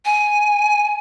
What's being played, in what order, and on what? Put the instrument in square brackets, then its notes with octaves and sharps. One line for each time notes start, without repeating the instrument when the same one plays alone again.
[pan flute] G#5